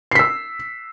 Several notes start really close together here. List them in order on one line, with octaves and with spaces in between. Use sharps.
C7 B6 E6